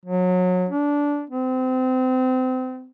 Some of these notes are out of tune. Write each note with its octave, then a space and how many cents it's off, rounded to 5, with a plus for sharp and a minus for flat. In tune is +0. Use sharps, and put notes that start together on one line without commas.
F#3 -25
D4 -15
C4 -30